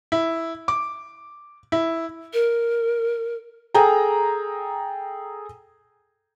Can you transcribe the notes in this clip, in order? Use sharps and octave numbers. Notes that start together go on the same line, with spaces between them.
E4
D6
E4
A#4
G#4 A4 G5 A#5